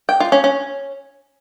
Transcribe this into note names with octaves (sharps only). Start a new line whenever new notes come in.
G5
F4
C#4
C#4